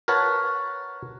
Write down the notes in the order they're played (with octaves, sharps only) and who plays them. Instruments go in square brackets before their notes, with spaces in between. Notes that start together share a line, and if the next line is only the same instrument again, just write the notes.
[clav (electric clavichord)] A#4 B4 C#5 F#5 A5